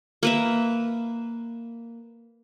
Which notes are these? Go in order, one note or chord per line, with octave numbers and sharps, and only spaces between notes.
A#3 B4 E5